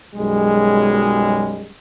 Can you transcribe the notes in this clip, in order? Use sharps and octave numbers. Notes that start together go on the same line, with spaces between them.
B1 F#2 G3 G#3